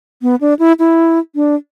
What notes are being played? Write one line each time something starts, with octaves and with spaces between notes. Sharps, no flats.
B3
D4
E4
E4
D4